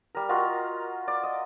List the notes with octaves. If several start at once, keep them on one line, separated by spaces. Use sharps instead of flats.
G3 A#4
F4 F#4 A#4 D#5
D5
D#5